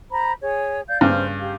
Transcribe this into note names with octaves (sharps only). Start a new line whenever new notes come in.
C5 A#5 B5
G#4 C#5
D5 F5 G6
G2 C#3 C5 F6
G4 F5